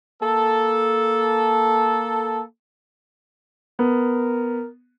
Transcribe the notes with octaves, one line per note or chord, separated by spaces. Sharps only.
A#3 A4
B3 A#4